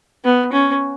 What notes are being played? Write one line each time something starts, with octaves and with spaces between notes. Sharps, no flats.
B3
C#4